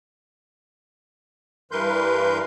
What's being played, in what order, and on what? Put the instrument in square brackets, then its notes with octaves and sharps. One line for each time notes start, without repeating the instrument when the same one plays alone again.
[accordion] G2 E3 A#4 B4 C6 G6